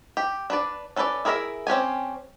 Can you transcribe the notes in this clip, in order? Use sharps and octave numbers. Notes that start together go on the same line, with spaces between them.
G4
D4 B4 D5
C#4 A4 B4 C5 D5
E4 G#4 A#4 C#5 E5
C4 C#4 G4 G#5